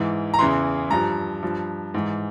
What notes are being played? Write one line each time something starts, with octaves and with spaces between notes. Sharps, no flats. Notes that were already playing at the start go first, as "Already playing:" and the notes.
Already playing: G#2 E3
A#5
E2 C#3 E3 C6
G2 F3 A#5
G2 F3
G#2 E3